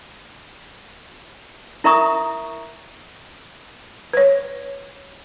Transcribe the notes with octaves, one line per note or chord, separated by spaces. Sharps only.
E4 A#4 E5 A#5 C#6 D#6
B4 C#5